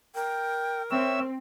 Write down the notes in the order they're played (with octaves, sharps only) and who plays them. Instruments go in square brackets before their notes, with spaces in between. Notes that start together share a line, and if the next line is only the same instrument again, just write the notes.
[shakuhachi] A#4 [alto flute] G5
[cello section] C4 [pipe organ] C#5 E5 E6 [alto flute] G5